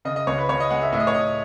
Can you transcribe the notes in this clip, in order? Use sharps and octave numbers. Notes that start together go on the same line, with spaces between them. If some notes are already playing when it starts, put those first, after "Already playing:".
C#3 D#5
D#5
C#2 C#5
B4
C#2 C#5
D#5
G#3 F#5
E5
A2 E5
D#5
C#5
A2 D#5